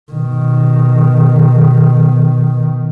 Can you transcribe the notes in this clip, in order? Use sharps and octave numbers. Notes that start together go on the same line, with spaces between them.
B2 D#3